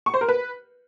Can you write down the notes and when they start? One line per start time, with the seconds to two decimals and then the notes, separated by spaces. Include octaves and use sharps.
0.06 C#6
0.14 C5
0.21 A#4
0.28 B4